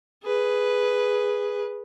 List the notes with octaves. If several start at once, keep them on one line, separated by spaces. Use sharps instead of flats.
G#4 B4